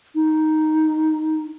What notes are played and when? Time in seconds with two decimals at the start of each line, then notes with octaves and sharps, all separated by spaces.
0.16 D#4